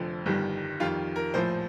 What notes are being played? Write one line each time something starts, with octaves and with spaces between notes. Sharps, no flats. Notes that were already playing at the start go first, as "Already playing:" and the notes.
Already playing: F1 F2 D3 F3
G1 G2 D#3 G3
F2 D#3 G3 F4
A#4
A#1 A2 F3 C5